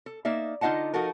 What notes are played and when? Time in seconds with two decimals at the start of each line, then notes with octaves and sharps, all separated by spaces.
0.06 A4
0.25 A#3 D#4 D5 E5
0.61 D3 D#4 F4 D#5 F#5 A5
0.93 F3 D#4 F#4 A4 A#4